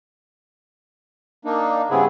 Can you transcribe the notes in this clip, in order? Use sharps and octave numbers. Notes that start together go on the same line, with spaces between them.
A#3 D4 D#4
G2 C#3 B3 C4 E4 G#4